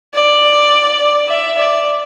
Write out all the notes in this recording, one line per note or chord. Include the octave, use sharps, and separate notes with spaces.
D5
E5
D5